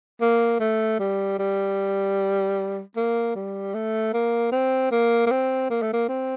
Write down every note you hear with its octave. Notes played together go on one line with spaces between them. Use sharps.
A#3
A3
G3
G3
A#3
G3
A3
A#3
C4
A#3
A#3
C4
A#3
A3
A#3
C4